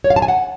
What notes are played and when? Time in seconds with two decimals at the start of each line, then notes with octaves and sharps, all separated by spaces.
0.04 C#5
0.10 F5
0.16 A5
0.22 G#5
0.28 F#5